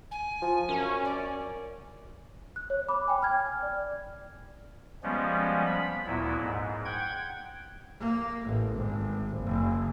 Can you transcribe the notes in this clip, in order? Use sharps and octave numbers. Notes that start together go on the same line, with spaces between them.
G#5
F3
F#2 C#4
D5
F#6
C#5
B5 D6
G5 G#5
F6 G#6
D5
F3 G3 G#3 B3 C#4
B5
D2 A#2 F#3 B3 E4
G#2
F#5 G5 G#6
A#3
A1
G#1
F#1